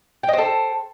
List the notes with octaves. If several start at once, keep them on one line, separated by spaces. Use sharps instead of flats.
A4 C5 D#5 G5